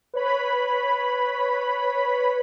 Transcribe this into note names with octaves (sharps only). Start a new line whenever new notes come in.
B4 C#5 B5